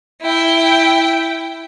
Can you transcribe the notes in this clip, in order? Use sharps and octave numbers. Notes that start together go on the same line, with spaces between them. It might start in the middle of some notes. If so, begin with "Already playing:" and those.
E4 G5